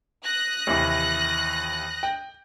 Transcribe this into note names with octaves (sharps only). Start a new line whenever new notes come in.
D#6 F#6 A#6
D#2 C3 E3
G5